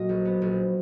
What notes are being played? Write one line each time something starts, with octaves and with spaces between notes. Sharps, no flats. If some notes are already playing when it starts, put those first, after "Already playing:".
Already playing: A#2 F#3 D#5
A#1
B3
A#1